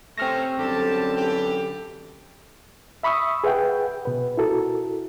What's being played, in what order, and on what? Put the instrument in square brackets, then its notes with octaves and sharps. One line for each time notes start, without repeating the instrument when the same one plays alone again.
[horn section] C3 A3 C#4 [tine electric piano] C4 F6 A#6
[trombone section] F#2 D3 A4 [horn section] G3 G4 A5
[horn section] E3 G4
[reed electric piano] E5 B5 C#6 D#6 E6
G#4 B4 E5 F#5 G5
B2 B4
E4 F#4 A4 A#4